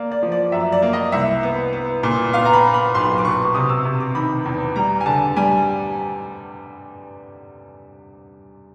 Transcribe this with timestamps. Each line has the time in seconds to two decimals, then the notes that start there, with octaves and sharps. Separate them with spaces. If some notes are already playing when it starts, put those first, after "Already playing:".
Already playing: A#3 D5
0.12 D5
0.23 F3
0.32 D5
0.52 F#2 E5
0.72 D5
0.82 A#3
0.93 D#5
1.12 C2 E5
1.43 B3
1.73 B3
2.03 A#2
2.33 B3 F5
2.45 A#5
2.53 B5
2.64 B3
2.74 B5
2.95 B1 C6
3.18 D6
3.25 B2 C#6
3.55 C3 D#6
3.69 E6
3.85 C3
4.00 D6
4.15 D#3 B5
4.45 E2
4.76 G3 A#5
5.01 G#5
5.06 D3 A5
5.36 G3 G#5